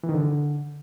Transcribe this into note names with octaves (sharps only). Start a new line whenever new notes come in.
E3
D#3
D3